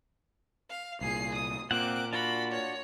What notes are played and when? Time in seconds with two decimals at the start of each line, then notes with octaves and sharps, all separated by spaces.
0.70 F5
1.01 C2 A#2 G#4 C7
1.35 D#6
1.71 A#2 A#3 C4 F#5 D6 F#6
2.13 D4 F4 F#4 B5
2.52 C#5